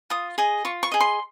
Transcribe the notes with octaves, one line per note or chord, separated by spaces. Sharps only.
F4 D#6
G#4 D#5
F4 C#6
C#6
G#4 D#5
C6